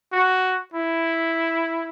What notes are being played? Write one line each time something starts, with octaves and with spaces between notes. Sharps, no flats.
F#4
E4